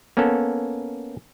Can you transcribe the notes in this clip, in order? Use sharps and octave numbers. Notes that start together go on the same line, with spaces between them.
A#3 B3 C#4 A4